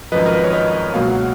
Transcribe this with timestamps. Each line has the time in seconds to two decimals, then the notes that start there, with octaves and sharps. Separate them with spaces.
0.12 G#1 F#2 F3 B4 D#5
0.26 A#4
0.35 B4
0.44 C#5
0.53 B4 D#5
0.94 C#2 B2 F#3 A#3 F5
1.08 F#5